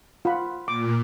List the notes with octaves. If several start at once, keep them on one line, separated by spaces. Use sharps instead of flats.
F4 F#5 B5
A#2 D6